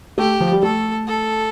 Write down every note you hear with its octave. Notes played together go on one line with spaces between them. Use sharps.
A3 G4
F3
G3
A3 A4
A4